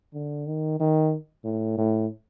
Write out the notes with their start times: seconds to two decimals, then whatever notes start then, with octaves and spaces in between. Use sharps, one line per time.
0.14 D3
0.46 D#3
0.80 D#3
1.45 A2
1.78 A2